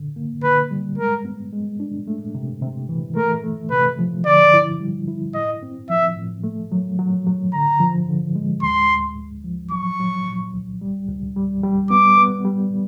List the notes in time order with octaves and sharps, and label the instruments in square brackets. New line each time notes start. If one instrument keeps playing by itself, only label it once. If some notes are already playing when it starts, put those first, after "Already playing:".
Already playing: [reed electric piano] D3
A#3
[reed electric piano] D3 [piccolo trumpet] B4
[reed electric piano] G3
[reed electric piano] G#3 [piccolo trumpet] A#4
[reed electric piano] B3
G#3
D4
A3
C3
C3
E3
[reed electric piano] A3 [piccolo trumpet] A#4
[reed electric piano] A3
[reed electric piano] C3 [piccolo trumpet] B4
[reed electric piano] F3
[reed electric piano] D3 [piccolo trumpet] D5
[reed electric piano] E4
G3
E4
[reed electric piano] A2 [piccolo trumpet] D#5
[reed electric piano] C4
[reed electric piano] F3 [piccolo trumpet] E5
[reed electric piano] A2
A3
F#3
F#3
F#3
[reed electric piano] D3 [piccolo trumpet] A#5
[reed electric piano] F3
D3
G#3
[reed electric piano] D2 [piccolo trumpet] C6
[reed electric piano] D2
D2
F3
[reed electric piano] F#3 [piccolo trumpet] C#6
[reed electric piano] F#3
A#2
C2
G3
C#2
G3
G3
[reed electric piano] B3 [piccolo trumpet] D6
[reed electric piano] B3
G3